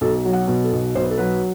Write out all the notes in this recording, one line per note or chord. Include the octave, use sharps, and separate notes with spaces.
B1 A4
F#3
F#5
B2
A4
B1
B1 C5
B4
A4
F#3 B4